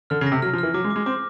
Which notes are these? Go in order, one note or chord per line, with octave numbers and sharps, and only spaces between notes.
D3 F6
C#3
A#6
C3
F#3 F6
F3
E3 F6
F#3 D6
G#3
D6
G#3
C4 D6